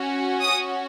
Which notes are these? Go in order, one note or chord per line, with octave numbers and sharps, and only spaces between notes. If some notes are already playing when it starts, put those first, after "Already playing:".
Already playing: C#4 F#4
D#6